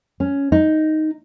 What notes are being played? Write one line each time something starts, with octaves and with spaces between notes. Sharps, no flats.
C#4
D#4